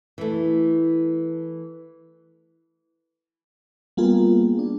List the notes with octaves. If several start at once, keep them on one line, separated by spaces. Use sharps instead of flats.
E3 A3
G3 A#3 B3 F4 G#4
D4